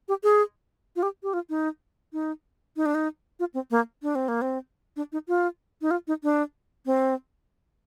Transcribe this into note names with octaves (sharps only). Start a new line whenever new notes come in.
G4
G#4
F4
G4
G4
F4
D#4
D#4
D#4
D4
D#4
F4
C4
A#3
D4
C4
A#3
C4
D4
D#4
F4
D#4
F4
D#4
D4
C4